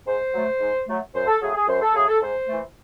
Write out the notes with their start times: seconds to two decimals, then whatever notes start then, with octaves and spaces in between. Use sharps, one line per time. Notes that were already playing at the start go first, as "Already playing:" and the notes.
0.07 G#2 C5
0.34 F#3 A3
0.60 G#2
0.88 F#3 A3
1.14 F#2 C5
1.27 A4
1.41 C#3 F#3 A3 G#4
1.55 G#4
1.68 F#2 C5
1.82 A4
1.95 C#3 F#3 A3 G#4
2.07 A4
2.22 G#2 C5
2.48 E3 A3